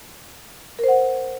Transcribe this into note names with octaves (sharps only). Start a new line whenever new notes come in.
A#4 C5 F#5